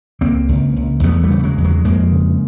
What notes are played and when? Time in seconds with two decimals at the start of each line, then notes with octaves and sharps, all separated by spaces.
0.21 C#2 A#3 C4
0.49 C#2
0.76 C#2
1.03 E2 A3 B3
1.23 G3 A3
1.30 C#3
1.39 A3
1.44 F#3 G#3
1.58 E2
1.64 F#3 G#3
1.85 F2 G#3 A#3
2.12 C#3